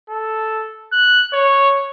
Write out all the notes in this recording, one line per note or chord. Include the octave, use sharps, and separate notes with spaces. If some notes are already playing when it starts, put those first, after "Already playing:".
A4
F#6
C#5